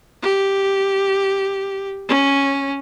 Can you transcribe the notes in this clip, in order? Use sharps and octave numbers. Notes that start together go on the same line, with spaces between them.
G4
C#4